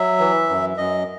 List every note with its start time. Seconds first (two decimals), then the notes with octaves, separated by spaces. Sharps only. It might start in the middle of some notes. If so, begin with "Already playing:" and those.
Already playing: F#3 E5
0.19 E3
0.49 F#2
0.77 F#2 D#5